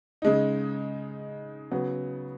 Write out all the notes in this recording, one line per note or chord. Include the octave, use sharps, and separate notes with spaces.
C#3 G#3 D#4
C#3 F#3 B3